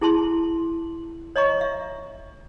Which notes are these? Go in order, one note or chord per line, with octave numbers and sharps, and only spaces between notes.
E4 G#4 A5 C6
C#5 D#5 A#5 C#6
E5